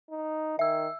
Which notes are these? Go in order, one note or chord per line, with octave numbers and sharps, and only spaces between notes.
D#4
D#3 E5 E6